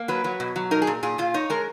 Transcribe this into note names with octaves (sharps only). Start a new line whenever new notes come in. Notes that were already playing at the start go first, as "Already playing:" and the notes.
Already playing: A#3
F#3 B4
F#3
B2
F#3
D#4 A#4
G#4
A#2
A#2 G#4
A#2 F4
D#4 C#5
G#3 A#4